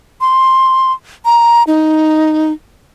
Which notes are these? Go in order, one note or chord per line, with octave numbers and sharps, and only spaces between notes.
C6
A#5
D#4